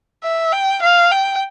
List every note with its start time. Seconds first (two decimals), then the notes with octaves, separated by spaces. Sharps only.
0.23 E5
0.53 G5
0.83 F5
1.11 G5